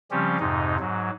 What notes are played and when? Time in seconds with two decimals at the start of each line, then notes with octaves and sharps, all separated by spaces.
0.11 C#3 F3 G3 C4 C#4 G4
0.40 F2 G#2 C3 D#4
0.80 G#2 F#3